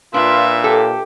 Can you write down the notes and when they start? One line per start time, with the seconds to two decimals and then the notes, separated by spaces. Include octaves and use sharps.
0.14 A#2 D4 F4 B4 E5
0.64 G4 A4